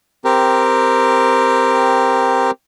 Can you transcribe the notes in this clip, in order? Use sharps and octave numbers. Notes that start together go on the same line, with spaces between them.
C4 G4 A#4